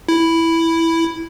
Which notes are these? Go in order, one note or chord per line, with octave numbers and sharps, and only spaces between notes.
E4